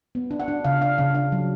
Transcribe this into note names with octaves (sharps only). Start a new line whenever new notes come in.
B3
D4
F#5
D4
C#3 F5
D4 F5
C#3 F5
D4 F5
F#3